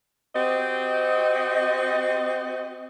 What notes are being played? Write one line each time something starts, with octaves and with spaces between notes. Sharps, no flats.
C4 F#4 G4 D#5